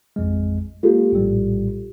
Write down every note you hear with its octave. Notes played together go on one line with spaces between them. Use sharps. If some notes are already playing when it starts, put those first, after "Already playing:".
A1 F2 G#3
G#3 A#3 F4 G4 A4
A#1 A2 G3